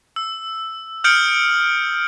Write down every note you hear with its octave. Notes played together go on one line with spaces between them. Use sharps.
E6
D#6 F6 G6 C#7 D7 F#7